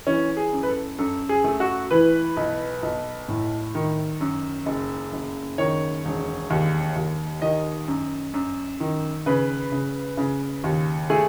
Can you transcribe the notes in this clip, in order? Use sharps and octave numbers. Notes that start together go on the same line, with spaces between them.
E3 C#4
G#4
F#2
B4
A4
F#2 A4
G#4
A3
F#4
E3 B4
B1
B1
A2
D#3
F#2
F#1
F#1
D#3 C#5
E1
D#2
D#2
D#3 D#5
F#2
F#2
D#3
C#3 B4
C#3
C#3
D#2
A3 G#4